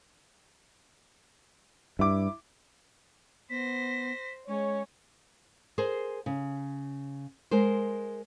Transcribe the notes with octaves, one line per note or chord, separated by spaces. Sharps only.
G2 E4 D6
B3 C5 A#6 B6
G#3 C#4 C#5
G#4 A#4 C5
C#3
G#3 A#4 C5